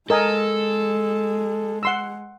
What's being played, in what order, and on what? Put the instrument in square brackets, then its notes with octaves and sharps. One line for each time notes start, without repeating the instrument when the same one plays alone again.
[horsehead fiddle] G#3 [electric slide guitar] A4 [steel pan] A#4 D#5 G#5
[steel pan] F#5 C6 E6